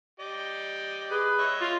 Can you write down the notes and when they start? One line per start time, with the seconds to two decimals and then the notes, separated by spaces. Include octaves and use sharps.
0.20 G4 D5 D#5
1.11 G#4 B4
1.38 C#5 D#5 E5
1.61 F4